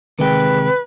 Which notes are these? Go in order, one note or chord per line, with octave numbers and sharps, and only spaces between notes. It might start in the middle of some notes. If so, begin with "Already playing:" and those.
C3 D#3 G#3 G#4 B4 G5